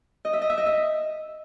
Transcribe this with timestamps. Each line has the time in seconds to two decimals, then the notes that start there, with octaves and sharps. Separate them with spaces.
0.25 D#5
0.33 E5
0.42 D#5
0.50 E5
0.58 D#5
0.66 E5